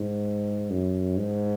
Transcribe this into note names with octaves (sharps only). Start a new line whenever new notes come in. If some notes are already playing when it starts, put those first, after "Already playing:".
Already playing: G#2
F#2
G#2